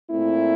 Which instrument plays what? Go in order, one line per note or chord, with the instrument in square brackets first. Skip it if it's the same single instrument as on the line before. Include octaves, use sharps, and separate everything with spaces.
[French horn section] A#2 A3 C4 E4